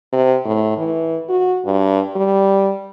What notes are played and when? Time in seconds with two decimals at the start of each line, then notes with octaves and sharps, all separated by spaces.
0.13 C3
0.45 A2
0.78 E3
1.29 F#4
1.66 G2
2.16 G3